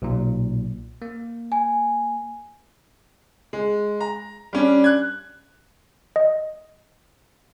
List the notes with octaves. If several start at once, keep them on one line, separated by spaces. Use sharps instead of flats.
B1 A#2
A#3
G#5
G#3
A#5
G3 C#4 D4
F#6 G#6
D#5